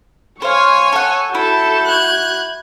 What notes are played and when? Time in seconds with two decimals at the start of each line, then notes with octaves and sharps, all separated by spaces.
0.42 C5 C#5 F5 G#5 C#6
0.92 A4 F#5
1.35 E4 F#4 A4 G6
1.86 F#6 G#6